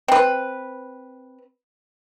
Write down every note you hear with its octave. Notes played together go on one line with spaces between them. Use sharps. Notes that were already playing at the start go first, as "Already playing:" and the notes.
C4 B4